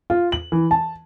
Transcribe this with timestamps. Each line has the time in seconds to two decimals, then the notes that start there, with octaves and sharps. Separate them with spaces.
0.10 F4
0.32 F#7
0.52 E3
0.71 A5